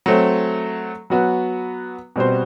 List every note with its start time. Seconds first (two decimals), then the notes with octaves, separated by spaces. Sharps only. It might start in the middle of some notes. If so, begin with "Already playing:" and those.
0.06 F#3 A3 C4
1.10 F#3 B3 F#4
2.16 B2 G3 C4 F#4 C5